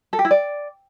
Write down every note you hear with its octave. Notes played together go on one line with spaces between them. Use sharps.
A4
G4
E4
D5